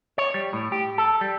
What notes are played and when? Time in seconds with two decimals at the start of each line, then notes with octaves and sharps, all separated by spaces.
0.18 C#5
0.34 G3
0.53 A2
0.72 G4
0.98 A4
1.21 G3